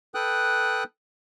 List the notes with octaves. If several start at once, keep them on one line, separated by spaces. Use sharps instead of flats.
A4 B4 G5 D#6 F#6